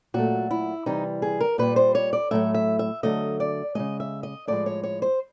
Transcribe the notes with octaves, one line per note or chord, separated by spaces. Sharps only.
A#2 F#3 A3 F#4
E4
C3 E3 G3 D#4
G#4
A#4
A#2 G3 B4
C5
C#5
D5
A2 F#3 A3 E5
E5
E5
D3 F#3 A3 D#5
D5
C#3 E3 G#3 D#5
E5
D#5
A2 F3 G#3 D5
C#5
C#5
C5